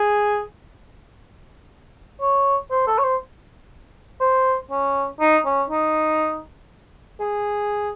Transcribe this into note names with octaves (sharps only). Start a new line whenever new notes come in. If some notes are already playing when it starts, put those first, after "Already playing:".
Already playing: G#4
C#5
C5
A4
C#5
C5
C5
C#4
D#4
C#4
D#4
G#4